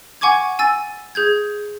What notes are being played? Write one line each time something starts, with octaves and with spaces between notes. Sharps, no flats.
F#5 G#5 C#6 D6 G#6
G#5 E6 A6
G#4 G6 G#6